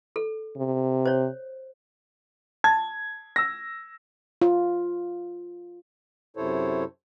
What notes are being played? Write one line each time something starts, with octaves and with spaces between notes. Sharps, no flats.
A4
C3
C5 C#5
A5 G#6
E6 A#6
F4
F#2 C3 E4 A4 C5 C#5